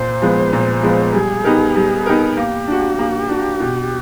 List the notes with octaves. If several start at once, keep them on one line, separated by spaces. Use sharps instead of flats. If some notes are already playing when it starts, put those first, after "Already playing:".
Already playing: A#2 C5
F3 G#3 B3
A#2
F3 G#3 B3
G3 G#4
B3 D#4 G4 A#4
G3
B3 D#4 G4 A#4
A#3 G4
D4 F#4
A#3
D4 F#4
B2